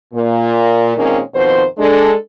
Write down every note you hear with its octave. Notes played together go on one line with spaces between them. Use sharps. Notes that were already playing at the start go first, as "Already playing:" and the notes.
A#2
A#2 D#3 G#3 A#3 C4 C#4
F2 B2 D#3 C5
G#3 D4 A4